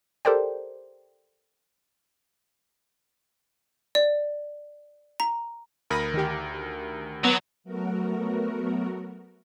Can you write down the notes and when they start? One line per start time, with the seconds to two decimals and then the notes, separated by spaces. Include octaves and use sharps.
0.25 G4 A4 A#4 C5 D5 G5
3.95 D5
5.20 A#5
5.90 D2 A#4 B5 D#6 A#6
6.14 D#3 G4
7.24 F#3 B3
7.64 F#3 A3 B3 F#4 A#4